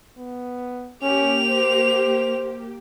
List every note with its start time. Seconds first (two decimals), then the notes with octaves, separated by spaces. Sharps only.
0.17 B3
1.03 A#3 C#4 G4 F7
1.50 C5